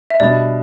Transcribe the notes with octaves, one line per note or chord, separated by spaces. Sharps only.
E5
B2 G3 D4 D5